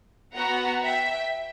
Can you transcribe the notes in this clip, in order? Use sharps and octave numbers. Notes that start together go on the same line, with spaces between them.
B3 F#4 F#5 A#5
E5 G5